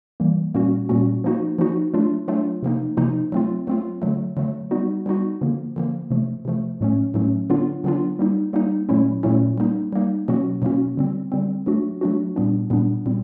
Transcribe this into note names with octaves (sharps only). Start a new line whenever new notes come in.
E3 G3 A#3
A#2 G3 A#3 C#4 F#4
A#2 G3 A#3 C#4 F#4
F3 A#3 D#4 F#4
F3 A#3 D#4 F#4
F#3 A3 D4 F4
F#3 A3 D4 F4
C3 F3 A#3 D#4
C3 F3 A#3 D#4
F#3 A3 C4 F4
F#3 A3 C4 F4
D3 F#3 A3
D3 F#3 A3
G3 B3 D#4 F#4
G3 B3 D#4 F#4
D3 F3 A#3
D3 F3 A#3
C3 F3 A3
C3 F3 A3
A2 F#3 A3 C#4
A2 F#3 A3 C#4
D3 F#3 B3 D4 F4
D3 F#3 B3 D4 F4
G3 A#3 D#4
G3 A#3 D#4
A#2 F#3 A3 C#4 E4
A#2 F#3 A3 C#4 E4
G3 A#3 D#4
G3 A#3 D#4
B2 F#3 A#3 C#4 F#4
B2 F#3 A#3 C#4 F#4
D3 G3 C4
D3 G3 C4
F#3 A3 D4 F#4
F#3 A3 D4 F#4
A#2 G3 B3 D4
A#2 G3 B3 D4
A#2 G3 C4